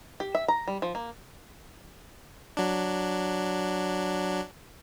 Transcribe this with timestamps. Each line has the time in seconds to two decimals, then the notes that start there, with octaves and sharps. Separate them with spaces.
0.20 G4
0.35 E5
0.48 A#5
0.68 G3
0.82 F3
0.95 A#3
2.57 F#3 D4